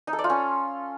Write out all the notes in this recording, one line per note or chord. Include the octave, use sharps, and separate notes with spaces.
D#4
A4
D5
F4
C#4